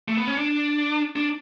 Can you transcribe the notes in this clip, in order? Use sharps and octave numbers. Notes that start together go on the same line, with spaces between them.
A3
B3
C#4
D4
D4